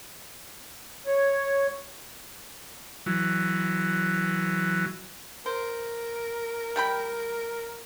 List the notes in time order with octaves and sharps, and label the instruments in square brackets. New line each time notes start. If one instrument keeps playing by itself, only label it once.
[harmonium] C#5
[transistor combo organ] E3 F#3
[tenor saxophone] A#4 [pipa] C5
[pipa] G3 G5 B5